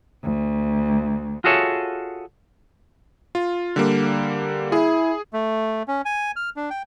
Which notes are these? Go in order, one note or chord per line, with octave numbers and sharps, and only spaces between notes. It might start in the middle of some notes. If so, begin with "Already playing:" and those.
D2
F4 F#4 G#4 A4 C#5 E5
F4
D3 G3 A#3
E4 G#4
A3
C#4
G#5
F6
D4
G5